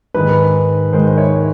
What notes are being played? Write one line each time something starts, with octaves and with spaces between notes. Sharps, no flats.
G#2 D#3 G#3 B4
G#2 D#3 G#3 C5
C5
C#5